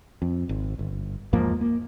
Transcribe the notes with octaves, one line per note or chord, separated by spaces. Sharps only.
F2
G#1
G1
E2 G#2 F3 A#3
A#3